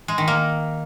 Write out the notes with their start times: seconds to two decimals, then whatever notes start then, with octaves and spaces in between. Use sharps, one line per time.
0.08 G#3
0.18 D#3
0.28 A#3